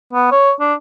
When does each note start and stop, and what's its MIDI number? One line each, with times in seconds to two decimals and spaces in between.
0.13 0.29 59
0.32 0.52 73
0.60 0.74 62